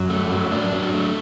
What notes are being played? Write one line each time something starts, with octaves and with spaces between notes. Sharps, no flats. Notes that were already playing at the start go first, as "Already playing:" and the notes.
Already playing: F#2 F#3
A3
F#3
D4
F#3
A3